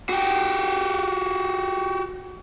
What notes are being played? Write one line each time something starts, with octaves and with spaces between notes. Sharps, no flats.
F#4 G4